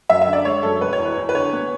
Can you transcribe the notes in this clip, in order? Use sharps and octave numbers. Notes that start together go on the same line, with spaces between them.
F#2 E5
E5
D3
D5
G#3 C#5
F#2 A4
E1 B4
C#5
E2
B4
E2
B4
D3 C#5
B3